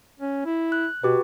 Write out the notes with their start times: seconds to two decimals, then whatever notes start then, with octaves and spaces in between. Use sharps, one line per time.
0.20 C#4
0.46 E4
0.72 F#6
1.04 B2 F#4 G4 B4